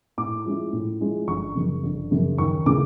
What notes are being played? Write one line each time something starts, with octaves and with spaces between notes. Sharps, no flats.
A2 D6
F3 G#3 C#4 E4
A2
F3 G#3 C#4 E4
G1 C#6
F#2 C#3
G1
F#2 C#3
D#2 C#6
C#3 E3 A3 D6